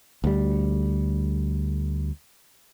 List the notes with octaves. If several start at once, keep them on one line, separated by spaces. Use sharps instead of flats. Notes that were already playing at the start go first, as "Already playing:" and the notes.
D2 G3